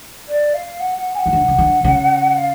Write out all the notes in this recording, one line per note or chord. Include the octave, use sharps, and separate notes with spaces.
D5
F5
F#5
F#5
G#5
F#5
D#3
D3
C#3
D3
C#3
F5